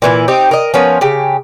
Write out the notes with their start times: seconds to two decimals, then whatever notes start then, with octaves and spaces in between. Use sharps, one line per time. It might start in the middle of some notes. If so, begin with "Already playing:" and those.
0.02 A#2 E3 E4
0.28 C4 D#4 G4
0.51 A#4 D#5
0.74 F3 B3 C#4 A#4
1.01 C#3 G4